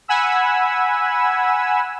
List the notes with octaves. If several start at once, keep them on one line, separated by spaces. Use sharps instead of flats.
F#5 G#5 B5 E6